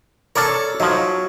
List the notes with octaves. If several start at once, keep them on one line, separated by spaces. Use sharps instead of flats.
A4 A#4 C#5 D5 A5
F3 F#3 D#4